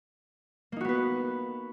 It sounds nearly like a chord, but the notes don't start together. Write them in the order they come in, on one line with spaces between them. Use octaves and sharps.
A#3 D#4 F#4 B3 B4